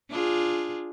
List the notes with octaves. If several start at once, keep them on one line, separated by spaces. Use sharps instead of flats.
D4 F4 G#4